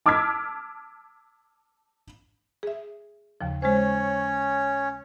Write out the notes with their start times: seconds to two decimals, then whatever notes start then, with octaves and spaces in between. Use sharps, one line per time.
0.06 A5 D6 E6 F6 G#6 B6
2.63 G#4 E5
3.41 D#2 C#3 F3
3.62 G#3 C#4 C5 C#5